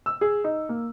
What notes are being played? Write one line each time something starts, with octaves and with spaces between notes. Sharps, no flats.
E6
G#4
D#4
A#3